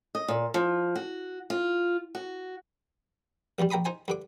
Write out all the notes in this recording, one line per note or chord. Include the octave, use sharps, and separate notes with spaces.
D#5
A#2
F3
F#4
F4
F#4
A#1 E2 G2 G3
A#1 G5 A#5 B5 D#6
D#4 C5 G#5
G2 D3 D6